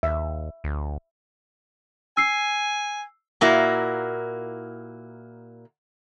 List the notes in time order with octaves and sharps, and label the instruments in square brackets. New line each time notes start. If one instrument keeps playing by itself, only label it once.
[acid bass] D#2 [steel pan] E5
[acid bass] D2
[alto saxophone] G#5 [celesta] E6 C7
[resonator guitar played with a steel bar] A#2 A#3 E4 F#4